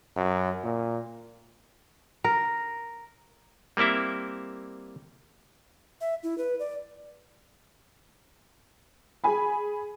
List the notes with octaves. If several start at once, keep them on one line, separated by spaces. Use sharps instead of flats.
F#2
A#2
A#4
G3 A#3 C4 E4 E5
E5
E4
B4
D5
G#4 G#5 B5